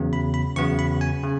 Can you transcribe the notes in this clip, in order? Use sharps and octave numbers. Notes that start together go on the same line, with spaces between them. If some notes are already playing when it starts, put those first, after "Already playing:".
Already playing: E2 C#3 F#3 B3
B5
B5
E2 C#3 F#3 B3 C#6
B5
G#5
C#3